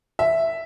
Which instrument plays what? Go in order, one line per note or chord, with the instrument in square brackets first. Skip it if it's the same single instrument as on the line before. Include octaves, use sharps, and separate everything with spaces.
[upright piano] E5